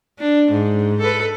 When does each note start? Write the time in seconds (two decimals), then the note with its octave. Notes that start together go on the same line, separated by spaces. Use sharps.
0.19 D4
0.51 G#2
1.01 A4 B4